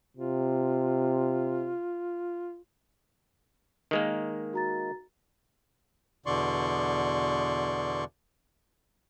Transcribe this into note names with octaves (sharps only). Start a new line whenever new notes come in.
C3 F4
D#3 G#3 A#3
F#4 A#5 A6
E2 B2 D3 D5 C6 C#6